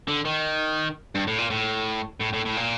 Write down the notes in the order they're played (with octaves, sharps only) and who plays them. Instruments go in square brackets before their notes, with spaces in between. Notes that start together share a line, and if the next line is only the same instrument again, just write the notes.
[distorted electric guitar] D3
D#3
G2
A2
A#2
A2
A2
A2
A2
A#2